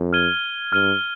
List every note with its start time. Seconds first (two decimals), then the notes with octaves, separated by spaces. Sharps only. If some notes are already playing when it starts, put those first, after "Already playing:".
Already playing: F2
0.13 F6 G#6 D#7 G7
0.72 G2 F6 G#6 D#7 G7